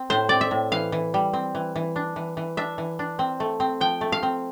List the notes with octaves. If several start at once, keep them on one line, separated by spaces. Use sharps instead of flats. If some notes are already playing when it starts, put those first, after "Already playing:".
Already playing: C4
A2 C5
C4 D5
E5
A2
E3 F5
E3
G3
C4
E3
E3
D4
E3
E3
D4 E5
E3
D4
C4
A3
C4
F3 G5
A3
F5
C4